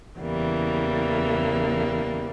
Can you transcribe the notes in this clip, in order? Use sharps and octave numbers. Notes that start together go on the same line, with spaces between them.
E2 C#3 E3 G3 A#3